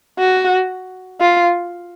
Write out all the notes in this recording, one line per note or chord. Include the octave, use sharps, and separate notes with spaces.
F#4
F4